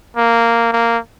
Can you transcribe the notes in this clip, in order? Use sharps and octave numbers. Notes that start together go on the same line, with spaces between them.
A#3
A#3